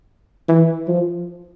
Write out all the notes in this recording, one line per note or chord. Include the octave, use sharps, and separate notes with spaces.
E3
F3